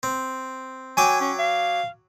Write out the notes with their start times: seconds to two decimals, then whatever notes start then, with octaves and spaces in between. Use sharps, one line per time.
0.03 C4
0.97 F#3 G5 G#5 D6
1.21 C#4
1.39 F5